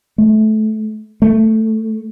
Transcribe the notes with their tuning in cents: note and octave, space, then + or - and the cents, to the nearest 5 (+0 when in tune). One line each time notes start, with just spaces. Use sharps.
A3 -20
A3 +5